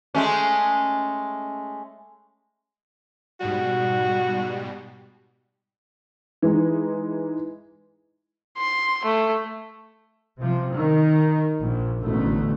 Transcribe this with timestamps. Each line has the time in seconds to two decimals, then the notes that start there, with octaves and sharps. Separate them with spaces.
0.15 G#3 A3 C#4
3.41 G#2 B2 G3 F#4
6.42 E3 G#3 D#4
8.58 C6
9.05 A3
10.39 C3 F3
10.73 D#3
11.59 A#1
12.01 A1 D2 B2 A3